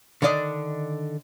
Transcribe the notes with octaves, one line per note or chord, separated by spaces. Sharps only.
D3 D#3 D4 D5 D#5